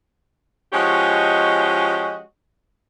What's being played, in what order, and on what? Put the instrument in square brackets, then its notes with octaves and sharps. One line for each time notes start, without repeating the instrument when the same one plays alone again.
[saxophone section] F3 G#3 C#4 F#4 G4 D#5